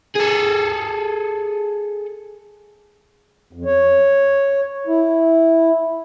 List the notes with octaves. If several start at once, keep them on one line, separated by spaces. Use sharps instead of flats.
G#4 A4
F2
C#5
E4